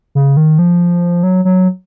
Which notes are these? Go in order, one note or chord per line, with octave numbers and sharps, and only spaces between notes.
C#3
D#3
F3
F#3
F#3